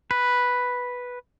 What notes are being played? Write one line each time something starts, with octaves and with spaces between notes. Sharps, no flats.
B4